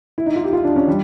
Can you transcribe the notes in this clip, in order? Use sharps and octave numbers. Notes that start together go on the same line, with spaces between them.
E4
D#4
F4
G4
F4
D4
C#4
G3